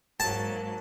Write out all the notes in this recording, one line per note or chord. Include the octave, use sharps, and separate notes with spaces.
G#2 F#3 A#3 A5